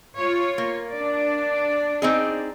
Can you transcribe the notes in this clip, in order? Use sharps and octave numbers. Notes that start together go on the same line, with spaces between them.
F4 C#5
A#3
D4 D5
C4 D#4 G#4